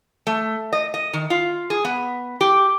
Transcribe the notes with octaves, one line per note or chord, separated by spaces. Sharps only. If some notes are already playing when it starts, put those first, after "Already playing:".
A3
D#5
D#5
D#3
F4
G#4
B3
G4